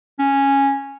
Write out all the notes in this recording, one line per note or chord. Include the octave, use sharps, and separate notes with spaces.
C#4